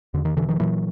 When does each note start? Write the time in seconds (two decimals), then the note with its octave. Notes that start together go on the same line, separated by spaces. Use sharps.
0.14 E2 D3
0.25 D#3
0.37 B2 D3 E3
0.49 D#3 F3
0.60 A#2 E3 F#3